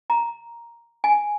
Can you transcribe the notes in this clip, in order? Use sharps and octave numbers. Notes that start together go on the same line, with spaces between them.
A#5
G#5